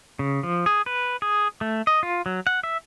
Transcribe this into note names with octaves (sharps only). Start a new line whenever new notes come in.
C#3
F3
G#4
B4
G#4
A3
D#5
F4
F#3
F#5
E5